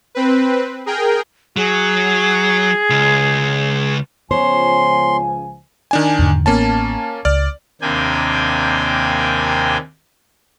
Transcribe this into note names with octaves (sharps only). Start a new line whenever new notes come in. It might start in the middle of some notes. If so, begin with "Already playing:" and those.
C4 B4
G#4 A#4 G5
F#3 G#4
C#2
C#2 F3 B3 C5 C#5 G#5 C6
D#3 D4 G#5
E2 G#2 D3
A1 A#3 B3 C#4 A5
C#2 D5 F6
D#2 C3 A#3 D4 G5 G#5